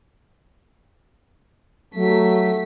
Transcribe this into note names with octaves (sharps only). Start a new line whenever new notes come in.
F#3 A3 B6